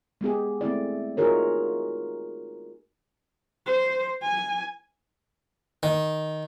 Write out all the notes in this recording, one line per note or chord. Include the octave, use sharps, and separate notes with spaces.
G#3 B3 G4 G#4
A3 C4 E4 D5
D#4 F4 F#4 G#4 A#4 C#5
C5
G#5
D#3